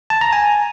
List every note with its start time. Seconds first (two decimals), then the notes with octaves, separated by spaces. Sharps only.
0.10 A5
0.21 A#5
0.33 G#5